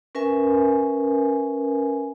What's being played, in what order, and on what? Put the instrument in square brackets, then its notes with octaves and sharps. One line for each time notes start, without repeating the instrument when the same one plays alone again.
[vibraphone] C#4 A#4 B4 E5 G#5